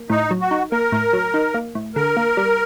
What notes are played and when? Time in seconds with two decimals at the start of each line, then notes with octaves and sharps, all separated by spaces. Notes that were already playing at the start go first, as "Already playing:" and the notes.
Already playing: A#3
0.10 A2 D#4
0.31 F#3
0.41 F#4
0.51 D#4
0.72 A#3 A#4
0.92 A2
1.13 F#3
1.34 D#4
1.54 A#3
1.75 A2
1.95 D3 A#4
2.17 A#3
2.37 G3